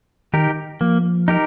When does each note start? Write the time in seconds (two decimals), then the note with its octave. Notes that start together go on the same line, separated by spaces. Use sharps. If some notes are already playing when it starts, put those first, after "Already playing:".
0.33 D#3 D#4 G4 A#4
0.81 F3 A#3
1.28 D#4 G4 A#4